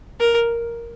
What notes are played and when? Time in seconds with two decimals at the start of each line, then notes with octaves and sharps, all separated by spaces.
0.20 A#4